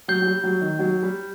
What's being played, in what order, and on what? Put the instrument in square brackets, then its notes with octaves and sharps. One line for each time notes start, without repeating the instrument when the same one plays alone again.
[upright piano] F#3 [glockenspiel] G6 C7 G7
[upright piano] F#3
G3
F#3
D#3
F#3
G3